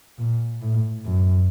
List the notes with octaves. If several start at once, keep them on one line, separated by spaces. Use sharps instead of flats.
A#2
A2
F#2